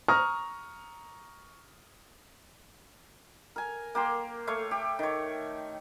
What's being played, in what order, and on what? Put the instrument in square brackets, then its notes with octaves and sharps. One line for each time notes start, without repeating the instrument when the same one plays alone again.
[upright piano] A#5 C#6 D#6 F6 A#6
[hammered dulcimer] A#4 G#5
A#3 G4 C6
A3 C#5 F5 C#6
G4
D#3 C#5